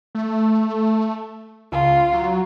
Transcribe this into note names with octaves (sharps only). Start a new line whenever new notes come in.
A3
C#2 F4
F#3